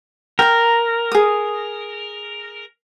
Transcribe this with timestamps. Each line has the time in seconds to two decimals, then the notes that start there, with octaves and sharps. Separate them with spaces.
0.39 A#4 G5 A#5
1.12 G#4 D#6